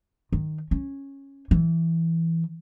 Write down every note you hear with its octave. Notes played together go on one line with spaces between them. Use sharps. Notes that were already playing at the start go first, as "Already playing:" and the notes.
D#3
C#4
E3